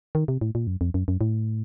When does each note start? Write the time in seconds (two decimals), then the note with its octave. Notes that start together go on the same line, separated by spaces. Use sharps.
0.15 D#3
0.28 C3
0.41 A2
0.55 A#2
0.67 F#2
0.81 F2
0.94 F#2
1.08 F#2
1.21 A2